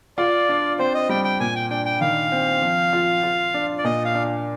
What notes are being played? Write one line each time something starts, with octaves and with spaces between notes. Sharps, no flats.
F4 D5
D4
C4 C5
D#5
G3 G5
G5
A#2 G#5
G5
D4 G5
G5
D#3 F5
C4
F3
F4
F4
D4
D5
A#2 D#5
F5
D4